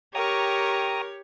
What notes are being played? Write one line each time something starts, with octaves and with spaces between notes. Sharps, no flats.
G4 A#4 C#5 G5 A#5 C#6 D#6